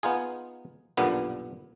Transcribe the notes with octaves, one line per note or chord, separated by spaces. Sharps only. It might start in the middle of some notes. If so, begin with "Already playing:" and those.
B3 D#4 F4 G#4
B1 G2 A#2 D3 B3